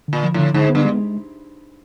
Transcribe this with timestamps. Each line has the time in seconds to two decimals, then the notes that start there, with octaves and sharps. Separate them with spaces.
0.08 A#2 D3
0.23 F3
0.34 A2 D3
0.54 G#2 D3
0.69 B3
0.75 G2
0.85 G#3